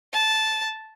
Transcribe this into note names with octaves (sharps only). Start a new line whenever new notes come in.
A5